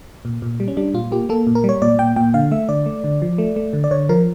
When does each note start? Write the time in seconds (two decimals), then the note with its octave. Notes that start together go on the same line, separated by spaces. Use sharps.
0.25 A#2
0.42 A#2
0.60 G3
0.68 C#4
0.77 G3 D4
0.94 A#2 F4
1.12 A#3 G4
1.29 A#3 A4
1.47 A#2
1.55 A#4
1.64 G3 C#5
1.82 A#2 D5
1.99 A#2 G5
2.16 A#2 G5
2.34 D3 F5
2.51 A3 E5
2.69 D3 D5
2.86 A3
3.04 D3
3.22 F3
3.38 A3
3.56 A3
3.73 D3
3.84 D5
3.91 D3 C#5
4.09 F3 A#4